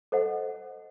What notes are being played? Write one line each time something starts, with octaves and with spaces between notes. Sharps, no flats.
A4 C5 D#5 F#5